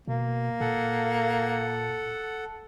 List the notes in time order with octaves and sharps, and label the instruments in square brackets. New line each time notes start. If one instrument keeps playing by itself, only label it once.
[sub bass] B2 [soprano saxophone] A#3
[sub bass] A#2 [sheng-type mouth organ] A4 F#5